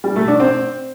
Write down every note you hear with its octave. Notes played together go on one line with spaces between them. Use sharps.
G3
A3
D4
C4